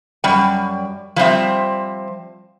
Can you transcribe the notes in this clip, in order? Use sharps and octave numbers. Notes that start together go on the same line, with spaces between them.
F#2 G3 G5
F3 G3 C4 E5